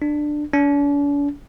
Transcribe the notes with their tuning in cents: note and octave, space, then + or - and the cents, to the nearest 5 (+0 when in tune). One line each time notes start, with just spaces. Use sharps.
D4 +15
D4 -45